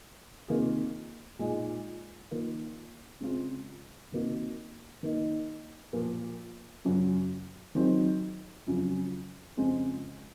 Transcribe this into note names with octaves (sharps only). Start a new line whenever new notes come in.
C3 D#3 A#3 F4 G#4
A#2 G#3 D#4 G#4
D#3 A#3 F4
C#3 G#3 C4 F4 G#4
C3 D#3 A#3 D#4 F#4
D#3 A#3 D#4
A#2 F3 A#3
F#2 C#3 F#3
D#3 F#3 C4 D#4 G#4
F2 C#3 F#3
F2 C#3 G#3 C4 F4